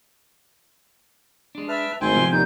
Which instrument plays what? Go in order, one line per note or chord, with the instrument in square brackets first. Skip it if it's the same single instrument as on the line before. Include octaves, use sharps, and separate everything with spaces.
[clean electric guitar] G#3 D4
[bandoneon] B4 A5 F6 [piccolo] E5
[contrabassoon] G#1 [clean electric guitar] A3 C4 [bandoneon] C5 G5 G#5 [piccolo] C6
[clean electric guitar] C3 F3 B3
[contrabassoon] D#2 [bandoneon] A2 G3 D#4 [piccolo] G6